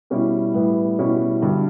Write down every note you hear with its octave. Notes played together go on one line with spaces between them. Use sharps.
B2 G3 C#4 E4
A2 G3 B3 E4
B2 G3 C#4 E4
G2 D3 F#3